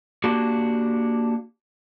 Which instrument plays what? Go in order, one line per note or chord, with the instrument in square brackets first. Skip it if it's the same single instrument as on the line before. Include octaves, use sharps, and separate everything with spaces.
[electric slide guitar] A#3 D4 F#4 G4